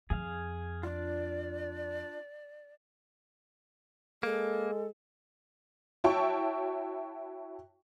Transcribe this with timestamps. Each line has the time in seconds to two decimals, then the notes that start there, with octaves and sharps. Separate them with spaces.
0.10 F2 G#4 F5
0.83 D4 F4 D5
4.23 G#3 A#3 A4
6.04 E4 F#4 C#5 G5 A5 C#6